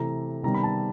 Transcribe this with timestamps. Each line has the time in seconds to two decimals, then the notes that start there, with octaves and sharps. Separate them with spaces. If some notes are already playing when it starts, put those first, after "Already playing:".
Already playing: C3 E3 A3 A#5
0.43 C3 D#3 G3 B3 A#5
0.54 B5
0.63 A5